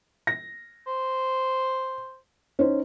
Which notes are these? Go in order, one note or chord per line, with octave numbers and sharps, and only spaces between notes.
A#6
C5
C#4 D#4 C5